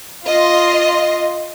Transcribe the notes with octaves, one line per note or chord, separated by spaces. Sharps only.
F4 D#5 C6